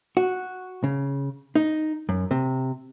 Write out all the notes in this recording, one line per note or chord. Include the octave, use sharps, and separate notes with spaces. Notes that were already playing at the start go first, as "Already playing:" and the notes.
F#4
C#3
D#4
F#2
C3